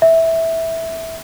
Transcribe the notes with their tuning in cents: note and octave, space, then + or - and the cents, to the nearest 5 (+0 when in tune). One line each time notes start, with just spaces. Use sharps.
E5 -10